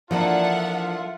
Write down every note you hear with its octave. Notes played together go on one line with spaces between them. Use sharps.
E3 F3 A#3 D4 F4 A4 E5 F#5